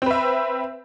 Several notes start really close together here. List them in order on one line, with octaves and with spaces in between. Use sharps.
C4 B4 E5